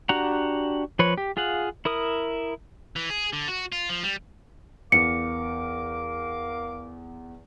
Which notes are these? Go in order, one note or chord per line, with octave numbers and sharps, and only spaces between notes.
D4 F#4 G4 F#5 A#5
F3 B4 C#5
G4
F4 G#4 F5 F#5
E4 A#4 D#6
E3
G#4
D3
F#4
F4
F3
G3
E2 A#4 F5 D6 C#7